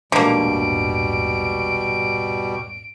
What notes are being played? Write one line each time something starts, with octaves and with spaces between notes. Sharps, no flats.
A#1 E2 G#2 B2 D3 G3 A#3 D7